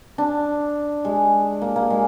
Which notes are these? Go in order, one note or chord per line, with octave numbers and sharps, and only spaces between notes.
D4
G#3
A#3
A#3
G#3